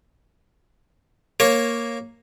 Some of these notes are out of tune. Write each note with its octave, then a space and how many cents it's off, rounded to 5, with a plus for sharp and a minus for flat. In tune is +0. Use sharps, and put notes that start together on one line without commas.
A#3 +0 C#5 -15